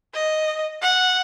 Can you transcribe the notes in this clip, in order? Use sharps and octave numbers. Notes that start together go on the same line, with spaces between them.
D#5
F#5